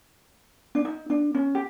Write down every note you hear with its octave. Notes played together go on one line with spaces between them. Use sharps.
D4
D#4
D4
C#4
G4